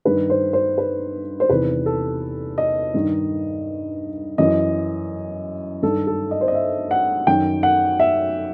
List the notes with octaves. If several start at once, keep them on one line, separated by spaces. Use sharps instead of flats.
G2 D#3 B4
C5
C5
B4
C5
E2 C3 D#3 B4
A4
D#5
G2 D#3
F#2 E3 D#5
G2 D#3 A4
A4
D#5
C5
D#5
E5
F#5
F#2 D#3 G5
F#5
E5